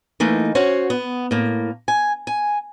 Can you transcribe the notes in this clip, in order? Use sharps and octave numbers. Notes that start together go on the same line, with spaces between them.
E3 A3 A#3 D#4
C#4 F#4 C5 C#5
B3
A2 A#3
G#5
G#5